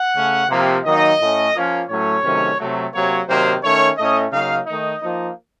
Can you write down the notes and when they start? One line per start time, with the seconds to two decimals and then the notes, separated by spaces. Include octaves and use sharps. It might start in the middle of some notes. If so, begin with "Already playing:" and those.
Already playing: F#5
0.15 C#3 A3 C#4
0.50 C3 F3 A#3
0.85 D#3 F#3 A#3 D#4 D#5
1.19 A2 A3 C#4
1.55 F3 A#3 C#4
1.88 A2 F#3 A3 C#4 C#5
2.24 C3 D#3 F#3 A3 C#4
2.59 C3 F#3 A3
2.93 C3 F#3 A#3 C#5
3.28 C3 D#3 F#3 A#3 C5
3.63 D#3 A3 C#4 C#5
3.97 A2 A3 C#4 D#5
4.31 C#3 F#3 A#3 D#4 F5
4.66 D#3 A3 D#4 D#5
5.01 F3 A#3 D#4